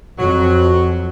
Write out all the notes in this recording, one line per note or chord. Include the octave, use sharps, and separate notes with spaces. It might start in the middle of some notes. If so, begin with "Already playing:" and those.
F2 F#3